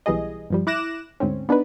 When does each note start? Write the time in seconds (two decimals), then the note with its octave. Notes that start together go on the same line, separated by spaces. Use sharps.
0.06 B1 E3 G3 G#4 D#5
0.50 G2 F3 G3
0.67 E4 D6 F#6 A#6 E7
1.20 D2 G#2 C4 C#4
1.49 B3 D4 D#4 B4